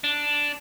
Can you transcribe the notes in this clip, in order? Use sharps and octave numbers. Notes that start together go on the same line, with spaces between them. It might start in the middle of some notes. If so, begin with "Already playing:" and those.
D4